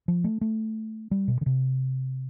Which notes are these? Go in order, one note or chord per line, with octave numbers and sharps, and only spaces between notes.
F3
A3
A3
G3
B2
D3
C3